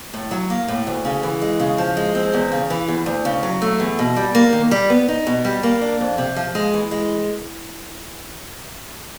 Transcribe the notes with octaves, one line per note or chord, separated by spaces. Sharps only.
A2
F#3
A#3
A2
D2
C#3
E3
G#3
C#3
F3
G#3
C4
E2
C#3
E3
E2
D2
C#3
F#3
A3
E2
B2
G3
A#3
D#3
G3
B3
D#4
B2
G3
A#3
D4
F2
C3
F3
G#3
E3
G#3